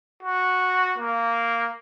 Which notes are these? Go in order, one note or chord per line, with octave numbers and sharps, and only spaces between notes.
F#4
A#3